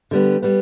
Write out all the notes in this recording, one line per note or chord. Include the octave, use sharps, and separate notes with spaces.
D3 G3 B3
G3 B3